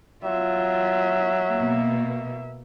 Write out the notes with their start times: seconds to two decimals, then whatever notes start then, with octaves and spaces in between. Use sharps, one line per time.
0.24 F#3 F4 E5
1.53 B2 A#3